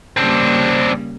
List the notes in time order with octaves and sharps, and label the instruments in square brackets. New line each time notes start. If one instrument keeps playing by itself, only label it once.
[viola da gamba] C#3 G3 A#3 [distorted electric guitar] C4 D4